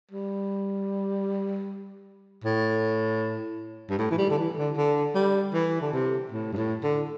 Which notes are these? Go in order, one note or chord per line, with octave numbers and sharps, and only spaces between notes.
G3
A2
G2
A2
E3
G3
D3
E3
D3
D3
G3
E3
D3
C3
A2
G2
A2
D3